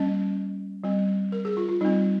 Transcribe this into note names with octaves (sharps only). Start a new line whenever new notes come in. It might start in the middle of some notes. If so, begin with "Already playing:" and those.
Already playing: G3 A#3 C#4 D#5
G3 C4
A#4
G#4
F4
F4
G3 C4 D#4